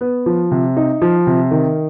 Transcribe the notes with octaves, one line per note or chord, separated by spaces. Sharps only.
B3
F3
C3
D#4
F3
C3
D#3